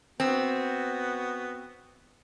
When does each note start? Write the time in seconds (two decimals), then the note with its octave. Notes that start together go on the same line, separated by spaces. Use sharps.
0.20 B3 C4 F#4